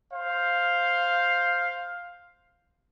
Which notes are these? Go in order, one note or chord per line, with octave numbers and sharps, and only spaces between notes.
C5 F5